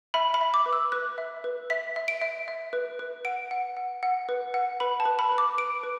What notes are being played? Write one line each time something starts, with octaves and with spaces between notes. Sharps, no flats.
E5 B5
B5
E5
D6
B4
E6
B4 F#6
E5
B4
E5 B6
E5
D7
E5
E5
B4
B4
F#5 D7
F#5
F#5
F#5
B4
F#5
B4 B5
A5
B4
B5
B4
D6
B4 D7
B4